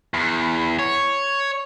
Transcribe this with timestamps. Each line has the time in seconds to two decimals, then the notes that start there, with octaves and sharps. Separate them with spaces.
0.14 E2
0.79 C#5